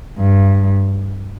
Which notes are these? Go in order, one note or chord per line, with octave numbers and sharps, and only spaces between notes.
G2